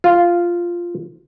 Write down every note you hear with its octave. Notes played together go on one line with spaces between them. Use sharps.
F4